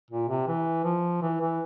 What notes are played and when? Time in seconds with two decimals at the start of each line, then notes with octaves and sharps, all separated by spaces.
0.11 A#2
0.29 C3
0.48 E3
0.84 F3
1.22 E3
1.41 E3